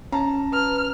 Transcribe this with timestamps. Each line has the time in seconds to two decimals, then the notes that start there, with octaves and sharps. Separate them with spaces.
0.12 C#4 A5 A#5
0.53 B4 F6